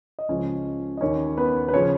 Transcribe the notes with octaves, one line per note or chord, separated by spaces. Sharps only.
D#5
C#2 C#3 F3 C#4 C#5
D#5
D#2 D#3 C#4 C#5
B3 B4
B4
C#3 F3 C#4 C#5